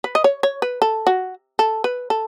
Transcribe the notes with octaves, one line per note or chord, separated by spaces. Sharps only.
B4
D#5
C#5
C#5
B4
A4
F#4
A4
B4
A4